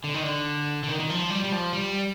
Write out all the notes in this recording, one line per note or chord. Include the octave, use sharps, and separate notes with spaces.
D3
D#3
D3
D3
D#3
D#3
F3
G3
G3
F3
G3